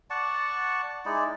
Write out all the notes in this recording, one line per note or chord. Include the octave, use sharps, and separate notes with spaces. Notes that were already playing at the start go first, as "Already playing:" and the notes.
D5 F#5 A5 C#6
G#3 D#4 E4 D5